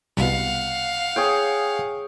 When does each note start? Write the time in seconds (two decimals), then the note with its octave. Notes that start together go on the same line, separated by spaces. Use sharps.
0.17 C2 B2 F5 F#5
1.16 G#4 C#5 G5